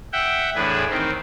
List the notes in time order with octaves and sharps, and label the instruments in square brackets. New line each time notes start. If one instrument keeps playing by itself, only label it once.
[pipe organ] E5 F#5 G5
E2 A2 D4 G#4 B4
D#3 C4